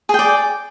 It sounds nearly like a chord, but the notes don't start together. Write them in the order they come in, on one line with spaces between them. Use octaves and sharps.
G#4 G5 D5